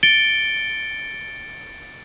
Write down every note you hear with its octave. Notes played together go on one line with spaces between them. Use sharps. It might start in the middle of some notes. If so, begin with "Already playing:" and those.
A6 C#7 D7 G7